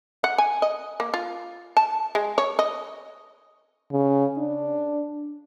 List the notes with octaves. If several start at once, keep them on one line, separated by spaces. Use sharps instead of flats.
F#5
G#5
D#5
A#3
F4
A5
G#3
C#5
D#5
C#3
D4